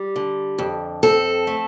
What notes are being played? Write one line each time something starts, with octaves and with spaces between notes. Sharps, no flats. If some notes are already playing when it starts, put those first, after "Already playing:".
Already playing: G3
D3
F2
C4 A4
A3